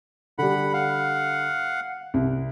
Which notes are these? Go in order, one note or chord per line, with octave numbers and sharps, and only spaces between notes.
D3 G3 F#5 B5
F5 F#5
C2